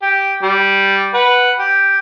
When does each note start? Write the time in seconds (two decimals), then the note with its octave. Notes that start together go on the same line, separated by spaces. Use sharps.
0.02 G4
0.43 G3
1.14 B4 F#5
1.59 G4